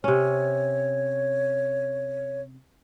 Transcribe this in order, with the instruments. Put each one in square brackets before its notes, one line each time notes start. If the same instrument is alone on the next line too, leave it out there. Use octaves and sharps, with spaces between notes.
[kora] C3 C#4 [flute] C#5